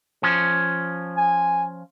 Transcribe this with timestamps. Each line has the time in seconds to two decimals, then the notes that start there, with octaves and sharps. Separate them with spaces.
0.23 F3 C#4
1.17 G#5